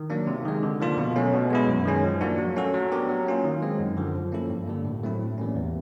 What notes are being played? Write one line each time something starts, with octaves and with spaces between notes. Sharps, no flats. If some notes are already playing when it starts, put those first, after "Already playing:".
Already playing: D#3
F#3 A#3 D4
C3
D#3 G#3
D3
F3 A#3 D4 F4
B2
F#3 A3 C#4
B2
G#3 B3 E4
F#2
D#3 G#3 C#4
F3
A#3 D4 F#4
F#3
A3 C#4 F#4 A4
F#3
B3 D4 G4 A#4
F#3
A#3 C#4 F4
D#3
G#3 C4
F#2
D3 F3
F3
A#3 C#4 E4 A4
G2
D3 G3 A#3
A2
F#3 A3 C4 E4
A2
E3 G3 A#3 C#4
E2